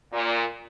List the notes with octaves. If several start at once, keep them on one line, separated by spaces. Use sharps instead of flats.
A#2